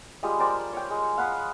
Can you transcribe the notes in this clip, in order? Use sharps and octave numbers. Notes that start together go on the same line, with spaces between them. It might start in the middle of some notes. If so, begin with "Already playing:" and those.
G3 G#3 F4 D#6
A#4 C5 D5 G5
C#5 G5
G#3
F5 F#5 B5 D#6